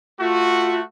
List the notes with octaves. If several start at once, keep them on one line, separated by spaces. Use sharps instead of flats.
A3 F4 F#4